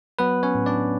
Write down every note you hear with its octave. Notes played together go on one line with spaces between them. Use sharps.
F#3 B3 B4
C#4 C#5
A2
D4 D5